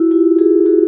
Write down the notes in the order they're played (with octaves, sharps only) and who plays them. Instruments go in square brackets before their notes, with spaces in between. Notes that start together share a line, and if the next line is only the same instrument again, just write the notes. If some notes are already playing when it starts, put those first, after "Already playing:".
Already playing: [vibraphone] E4 F#4
F4 G4
F#4 G#4
F#4 G#4